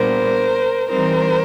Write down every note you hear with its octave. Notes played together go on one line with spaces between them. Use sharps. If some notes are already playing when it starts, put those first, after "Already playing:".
Already playing: A#2 G3 B3 D4 A#4 C5
E3 G3 C4 D#4 A#4 C5